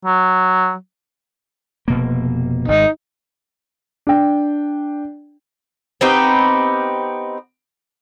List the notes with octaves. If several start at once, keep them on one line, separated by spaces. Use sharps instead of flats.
F#3
F1 B2 A#3
G#1 G#2 G#3 D#4
D4 G5
B3 C4 D#4 G4